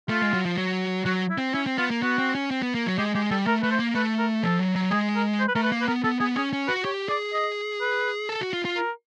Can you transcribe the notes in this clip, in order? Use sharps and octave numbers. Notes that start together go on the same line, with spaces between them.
A3 F4
G#3
F#3
F3
F#3
F#3 F#4
E4
C4
C#4 E4
C4
B3 F4
A#3
B3 F#4
C4
C#4
C4
B3
A#3
F#3
G#3 G4
G#3 G4
G3 A4
A3 A#4
A3 B4
C5
A#3
A3 B4
A#4
F3 A4
F#3
F#3
G#3 G#4
A#4
C5
B4
A3 A#4
B4
A#3
B4
B3 A#4
B3 A4
B3 G#4
C#4 G#4
C#4
F#4 B4
G4 C#5
G#4 D5
D#5
B4
A4
F#4
F4
F4
A#4